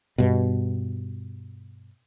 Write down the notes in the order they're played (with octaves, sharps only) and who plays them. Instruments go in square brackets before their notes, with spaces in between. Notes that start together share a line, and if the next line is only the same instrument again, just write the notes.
[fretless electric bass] G2 B2